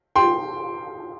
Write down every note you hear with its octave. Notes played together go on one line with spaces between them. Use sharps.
G5 C6